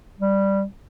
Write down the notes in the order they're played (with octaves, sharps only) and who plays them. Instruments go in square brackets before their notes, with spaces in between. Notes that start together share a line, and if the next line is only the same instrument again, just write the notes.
[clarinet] G3